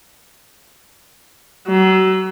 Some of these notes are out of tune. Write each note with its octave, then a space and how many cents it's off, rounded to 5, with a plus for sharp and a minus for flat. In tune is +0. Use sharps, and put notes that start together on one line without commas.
F#3 +30